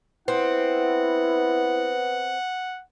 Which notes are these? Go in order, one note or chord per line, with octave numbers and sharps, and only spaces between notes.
B3 C4 E4 F#5